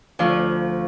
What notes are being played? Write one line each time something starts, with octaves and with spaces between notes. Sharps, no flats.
D2 F3 F4 F5